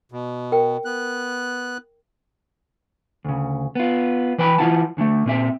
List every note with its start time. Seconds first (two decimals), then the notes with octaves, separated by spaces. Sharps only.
0.12 B2
0.52 A#4 G5
0.85 B3 F#6
3.25 D2 C#3
3.75 B3 F4
4.38 E3 B4 G5 B5
4.58 E3 G#3 E4 F4 F#5 A5
4.97 D2 D3 F#3 A3
5.26 A#2 C4 E5